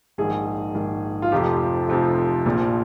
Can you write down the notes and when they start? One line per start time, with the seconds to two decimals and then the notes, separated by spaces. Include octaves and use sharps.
0.18 A#1 G#2 D#3 G#4
0.75 A#1 G#2 D#3
1.22 F4
1.32 F1 F2 C3 F3 G4
1.89 F1 F2 C3 F3
2.46 A#1 A#2 F3